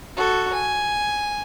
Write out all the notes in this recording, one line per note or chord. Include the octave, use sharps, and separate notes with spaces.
F#4 A4
G#5